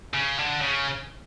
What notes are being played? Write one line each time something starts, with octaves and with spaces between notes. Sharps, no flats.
C#3
D3
C#3